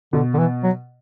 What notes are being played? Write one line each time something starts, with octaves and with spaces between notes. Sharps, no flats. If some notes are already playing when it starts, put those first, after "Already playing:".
B2 D3
D3
E3
F#3